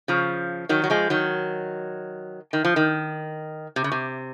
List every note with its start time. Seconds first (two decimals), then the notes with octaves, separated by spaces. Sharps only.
0.08 C#3 F3
0.69 D#3 F#3
0.84 F#3
0.90 F3 G#3
1.10 D#3 F#3
2.53 D#3
2.65 F3
2.76 D#3
3.76 C3
3.84 C#3
3.92 C3